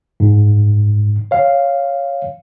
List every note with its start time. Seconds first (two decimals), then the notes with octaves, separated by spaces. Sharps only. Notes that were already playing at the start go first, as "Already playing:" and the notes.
0.20 G#2
1.31 C#5 F5